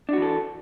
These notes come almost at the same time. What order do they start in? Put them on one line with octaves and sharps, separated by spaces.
D4 F#4 E3 A4